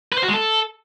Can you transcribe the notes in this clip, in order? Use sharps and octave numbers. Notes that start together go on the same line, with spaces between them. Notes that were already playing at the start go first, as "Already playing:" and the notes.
B4
C5
F#4
G#3
A4